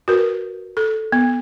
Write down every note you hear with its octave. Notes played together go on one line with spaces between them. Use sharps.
F#4 A#4 B4
A4
B3